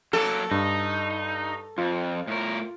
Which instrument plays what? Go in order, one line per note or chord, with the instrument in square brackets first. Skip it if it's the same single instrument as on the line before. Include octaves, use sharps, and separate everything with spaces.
[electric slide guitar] F#3 A#3 [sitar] A4
[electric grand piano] G2 [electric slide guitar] D#4
[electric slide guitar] F2 [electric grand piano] F4
[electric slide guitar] A2 A#4